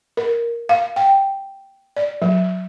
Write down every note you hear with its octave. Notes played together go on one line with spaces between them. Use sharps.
A#4
F5
G5
D5
F#3